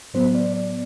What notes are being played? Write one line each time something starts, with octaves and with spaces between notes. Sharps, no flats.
A2 F#3 B3 C5
D5
D5